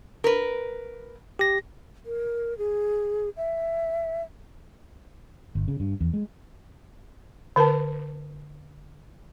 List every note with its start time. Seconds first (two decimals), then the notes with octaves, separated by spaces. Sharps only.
0.24 A#4 B4
1.39 G4 A#6
2.06 A#4
2.58 G#4
3.37 E5
5.55 G1
5.68 C#3
5.80 G2
6.01 E2
6.14 G#3
7.56 D3 A#4 B4 A5